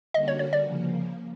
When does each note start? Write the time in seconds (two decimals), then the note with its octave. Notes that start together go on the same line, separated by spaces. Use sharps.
0.14 D3 G3 A#3 C#4 F#4 D#5
0.28 C#5
0.39 C#5
0.53 D5
0.65 C#3 F3 A#3